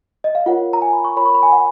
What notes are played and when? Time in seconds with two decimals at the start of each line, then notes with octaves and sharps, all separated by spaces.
0.24 D#5
0.35 F5
0.46 F4 A#4 C#5 F#5
0.73 A#5
0.82 G#5
0.93 B5
1.04 C#6
1.16 F4 A#4 C#5 B5
1.25 C#6
1.35 B5
1.43 G#5
1.52 F#5